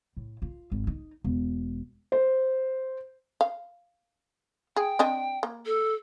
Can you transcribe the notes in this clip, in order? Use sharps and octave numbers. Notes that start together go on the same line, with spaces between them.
A2
F4
G#1
D#4
E1
C5
F5
G#4 G5
C4 D4 D#5
A#3
A4